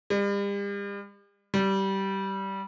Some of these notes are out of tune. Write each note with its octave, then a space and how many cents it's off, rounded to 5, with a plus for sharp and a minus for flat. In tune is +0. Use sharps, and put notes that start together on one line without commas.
G3 +40
G3 -15